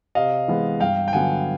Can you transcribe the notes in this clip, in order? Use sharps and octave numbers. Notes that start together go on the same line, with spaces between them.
C3 D#5 F5
E3 G#3 B3
G2 F5 G5
G5
D3 F#3 B3 F#5 G#5